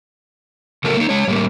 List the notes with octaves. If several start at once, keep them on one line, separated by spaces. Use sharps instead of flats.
C#3 F#3 A3 A4 A#4
A#3 D#4
G#3 C#5
A2 G3 A#3